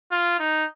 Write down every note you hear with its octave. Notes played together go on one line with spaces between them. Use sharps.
F4
D#4